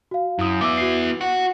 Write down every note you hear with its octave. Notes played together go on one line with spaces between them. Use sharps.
F#4 F5
F#2 E4 D#6
B3 E4 D6 E6
F#4 C7
F#4 F#5